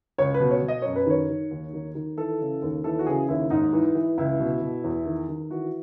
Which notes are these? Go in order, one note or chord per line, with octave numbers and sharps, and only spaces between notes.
C#2 C#5
B4
B2
C#5
B2
D#5
F#2 C#5
B4
D#3 C#5
D#3
D#2
D#3
D#3
E3 A4
C#3
D#2
E3 A4
F#4
C#3 G#4
D#2 E4
G#2 D#4
E3
E3
C#2 E4
B2
B2
E2
D#3
D#3
E3 F#4